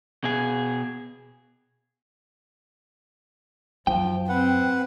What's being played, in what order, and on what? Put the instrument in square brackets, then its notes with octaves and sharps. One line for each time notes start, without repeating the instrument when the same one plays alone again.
[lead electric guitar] B2 G#4
[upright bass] F#2 [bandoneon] F3 [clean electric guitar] G5
[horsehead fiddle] C4 [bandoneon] B4 F#5